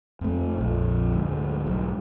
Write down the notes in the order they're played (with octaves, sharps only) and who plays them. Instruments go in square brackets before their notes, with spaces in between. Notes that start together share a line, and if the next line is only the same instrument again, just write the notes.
[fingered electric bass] F2 A3
A#1 F2
D2 G#2
B1 G#2